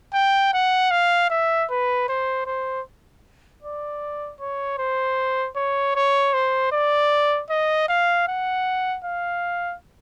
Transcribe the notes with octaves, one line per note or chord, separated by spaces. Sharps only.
G5
F#5
F5
E5
B4
C5
C5
D5
C#5
C5
C#5
C#5
C5
D5
D#5
F5
F#5
F5